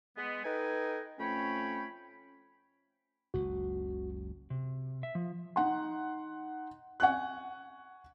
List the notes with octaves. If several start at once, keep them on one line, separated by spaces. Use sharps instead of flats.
G#3 B3
D#4 A4 B4 D#5 G5 G#5
F2 A3 C#4 C#5 G5 B5
F#1 C#2 F#4
C3
E5
F3
D#4 F#5 C6
F#5 G#5 C#6 F#6